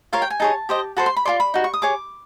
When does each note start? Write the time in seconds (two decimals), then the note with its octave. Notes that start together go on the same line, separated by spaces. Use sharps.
0.13 F4 A#4 C#5 F5
0.22 G5
0.30 G#5
0.40 D#4 G#4 C#5 A5
0.69 G4 C5 D#5
0.97 F#4 A4 C5 B5
1.06 C6
1.17 B5
1.25 F4 A4 D5 C6
1.40 B5
1.54 D#4 F#4
1.64 C#6
1.74 D#6
1.82 G#4 C#5 D6